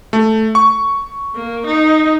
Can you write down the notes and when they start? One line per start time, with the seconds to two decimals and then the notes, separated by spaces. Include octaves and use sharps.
0.13 A3
0.55 C#6
1.35 A#3
1.66 D#4